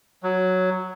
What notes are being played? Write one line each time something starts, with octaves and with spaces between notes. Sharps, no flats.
F#3